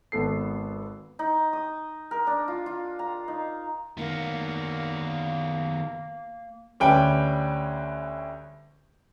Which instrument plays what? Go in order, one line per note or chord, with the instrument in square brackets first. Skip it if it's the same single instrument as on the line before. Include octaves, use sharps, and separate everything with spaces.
[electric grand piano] G#1 B3 A4 C7
[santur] D#4
D#6
A#4
D4
F4
F4
A#5
D#4
[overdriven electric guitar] D#3 B3 [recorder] A#3
[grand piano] D2 G3 C#4 B4 G5 G#5